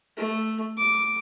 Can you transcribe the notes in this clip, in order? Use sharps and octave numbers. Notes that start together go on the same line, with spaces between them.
A3
D6